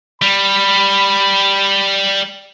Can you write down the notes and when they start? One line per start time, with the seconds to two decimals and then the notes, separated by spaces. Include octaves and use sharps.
0.22 G3 B5